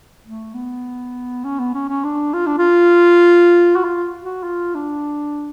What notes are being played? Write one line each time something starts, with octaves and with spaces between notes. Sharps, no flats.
A3
B3
C#4
B3
C#4
C#4
D4
F4
D4
F4
F#4
F4
F#4
F4
D4